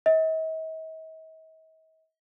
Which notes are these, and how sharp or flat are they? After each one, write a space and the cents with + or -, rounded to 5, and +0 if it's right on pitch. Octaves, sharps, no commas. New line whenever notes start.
D#5 +45